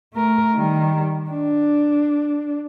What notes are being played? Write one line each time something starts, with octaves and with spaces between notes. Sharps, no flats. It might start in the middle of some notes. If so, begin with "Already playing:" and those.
A3 A#4
D#3 G3
D4